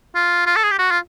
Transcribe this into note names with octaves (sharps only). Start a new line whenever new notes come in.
F4
F4
A4
G#4
G4
F#4
F4